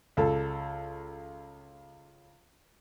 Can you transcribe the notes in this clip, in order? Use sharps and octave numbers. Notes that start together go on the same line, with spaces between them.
C#2 A4